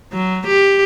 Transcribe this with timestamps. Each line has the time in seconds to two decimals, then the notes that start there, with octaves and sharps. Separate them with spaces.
0.13 F#3
0.47 G4